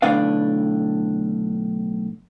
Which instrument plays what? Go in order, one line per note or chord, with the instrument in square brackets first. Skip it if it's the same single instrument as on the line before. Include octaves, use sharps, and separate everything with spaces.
[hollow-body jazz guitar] B1 A2 D3 D4 B4 F5